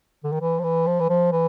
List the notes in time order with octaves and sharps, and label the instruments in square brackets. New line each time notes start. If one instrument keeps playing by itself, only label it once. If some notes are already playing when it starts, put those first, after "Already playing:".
[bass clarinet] D3
D#3
E3
F3
E3
F3
E3
F3
E3